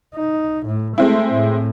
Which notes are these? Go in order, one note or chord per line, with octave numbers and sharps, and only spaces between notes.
D#4
A2
G#3 A3 C4 E4
A2